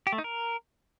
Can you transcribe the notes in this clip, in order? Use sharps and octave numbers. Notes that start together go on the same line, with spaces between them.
G4
A3
D#4
A#4